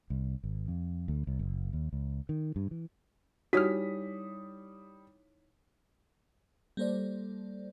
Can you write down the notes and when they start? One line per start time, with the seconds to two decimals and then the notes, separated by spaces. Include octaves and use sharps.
0.10 C2
0.44 G#1
0.68 F2
1.08 D2
1.27 C2
1.39 F#1
1.73 D#2
1.93 C#2
2.29 D#3
2.56 G2
2.71 E3
3.53 G3 D#4 E4 F#4 C#5 D#6 F6 B6
6.77 G3 A#3 A4 C5 D5